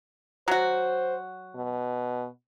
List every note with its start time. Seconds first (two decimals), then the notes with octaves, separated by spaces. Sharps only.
0.48 F#3 F#4 C5
1.55 B2